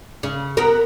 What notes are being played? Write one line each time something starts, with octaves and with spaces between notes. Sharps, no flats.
C#3
B3 A#4